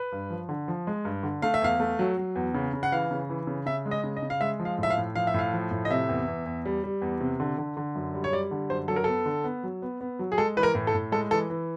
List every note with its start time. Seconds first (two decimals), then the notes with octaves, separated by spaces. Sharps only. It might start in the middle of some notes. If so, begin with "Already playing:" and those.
Already playing: B4
0.12 G2
0.30 F3
0.49 D3
0.68 F3
0.87 G#3
1.05 G2
1.23 D3
1.42 A3 F5
1.54 E5
1.62 E2 F5
1.80 A3
1.99 F#3
2.17 F#3
2.36 E2
2.54 C#3
2.73 C#3
2.83 F#5
2.92 E3 F5
3.11 C#3
3.30 E3
3.47 C#3
3.66 C#3 E5
3.86 G#3
3.91 D#5
4.04 C#3
4.17 D#5
4.22 C#3
4.30 F5
4.41 G#3 E5
4.60 F3
4.65 F5
4.78 A2 E5
4.90 F5
4.97 A2
5.15 F3 F5
5.27 E5
5.34 A2 F5
5.53 F3
5.71 A2
5.85 D#5
5.90 C3 E5
6.09 E2
6.28 E2
6.46 E2
6.65 G3
6.84 G3
7.02 E2
7.21 C3
7.40 D3
7.58 D3
7.77 D3
7.95 F#2
8.14 G3
8.24 C#5
8.32 G3 D5
8.51 D3
8.70 F#2 C5
8.88 F#3 A4
8.96 A#4
9.04 B3 A4
9.26 D3
9.44 B3
9.64 F#3
9.82 B3
10.01 B3
10.19 F#3
10.32 G#4
10.38 G#3 A4
10.57 E3 B4
10.63 A#4
10.75 A2
10.87 A4
10.94 A2
11.12 G#3 A4
11.31 E3 A4
11.50 E3